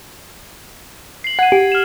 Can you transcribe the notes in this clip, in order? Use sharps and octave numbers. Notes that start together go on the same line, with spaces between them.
C7 F#7
F#5 G#6 D#7
G4
F6 E7